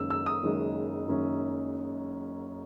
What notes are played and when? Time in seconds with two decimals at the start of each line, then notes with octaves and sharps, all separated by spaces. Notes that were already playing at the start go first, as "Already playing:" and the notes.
Already playing: F#1 F#2 D#3 G#3 C#4 E6
0.10 E6
0.26 D#6
0.43 F#1 F#2 D#3 G#3 C#4
1.08 F#1 F#2 D#3 G#3 C#4